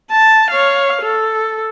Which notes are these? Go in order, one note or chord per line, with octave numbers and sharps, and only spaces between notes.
A5
C#5 F5
A4